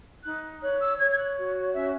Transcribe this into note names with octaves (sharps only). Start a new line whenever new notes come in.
D#4 F#6
C#5 F#6
E6
C#5 G#6
G#6
F#6
F#4
C#4 E5